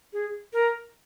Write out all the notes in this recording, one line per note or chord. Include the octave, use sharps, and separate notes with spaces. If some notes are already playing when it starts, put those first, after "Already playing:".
G#4
A#4